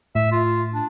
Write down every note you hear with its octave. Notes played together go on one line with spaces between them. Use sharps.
A2 E5
F4
D4